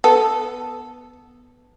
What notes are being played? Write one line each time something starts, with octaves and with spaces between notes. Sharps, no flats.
B3 A4